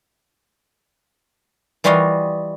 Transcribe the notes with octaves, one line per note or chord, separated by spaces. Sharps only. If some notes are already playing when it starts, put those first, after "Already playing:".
E3 G3 F4 F#4 D#5 F5